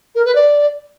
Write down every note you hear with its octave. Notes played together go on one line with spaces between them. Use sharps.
A#4
B4
D5